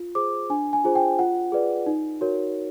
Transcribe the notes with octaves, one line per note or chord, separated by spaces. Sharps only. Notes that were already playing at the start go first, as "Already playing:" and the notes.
Already playing: F4
G#4 C5 D6
D4 G#5
G#5
F4 G#4 C5
G5
F4 F#5
G#4 B4 D5
D#4
F#4 A#4 C#5